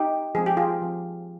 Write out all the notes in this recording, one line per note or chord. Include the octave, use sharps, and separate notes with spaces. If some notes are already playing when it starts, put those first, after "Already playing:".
Already playing: D#4 G4
F3 G#3 C4 G#4
G4
F4 G#4
F3 C4